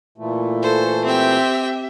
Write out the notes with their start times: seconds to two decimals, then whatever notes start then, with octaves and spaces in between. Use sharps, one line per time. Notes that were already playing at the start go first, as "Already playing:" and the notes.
0.18 A#2 E3 A3
0.63 A4 C5
1.05 C4 G4 E5 G5